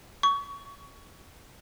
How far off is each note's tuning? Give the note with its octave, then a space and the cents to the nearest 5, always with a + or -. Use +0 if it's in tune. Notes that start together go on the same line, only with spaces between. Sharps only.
C#6 +25